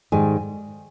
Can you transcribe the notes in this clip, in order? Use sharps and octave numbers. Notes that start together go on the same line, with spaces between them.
G#2 D#3 G3 G#5